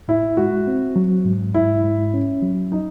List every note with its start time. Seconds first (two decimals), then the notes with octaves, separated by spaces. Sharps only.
0.08 A2 E4
0.37 G#3 F#4
0.67 C4
0.96 F#3
1.25 G#2
1.54 G#2 E4
1.84 G#2
2.14 C#4
2.42 F#3
2.72 D#4